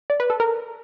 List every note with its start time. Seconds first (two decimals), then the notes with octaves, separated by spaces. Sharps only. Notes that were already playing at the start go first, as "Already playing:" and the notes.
0.10 D5
0.20 B4
0.30 A4
0.40 A#4